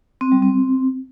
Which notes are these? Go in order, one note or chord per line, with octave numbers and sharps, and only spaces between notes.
C4
G3
C4